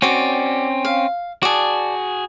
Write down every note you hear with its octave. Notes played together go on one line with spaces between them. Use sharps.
C4 C#4 F#4 D5
F5
F#4 G#4 D5 A5